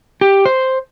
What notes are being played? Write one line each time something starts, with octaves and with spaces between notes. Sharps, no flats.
G4
C5